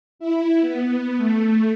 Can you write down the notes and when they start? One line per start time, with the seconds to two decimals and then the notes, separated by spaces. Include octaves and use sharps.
0.19 E4
0.61 B3
1.18 A3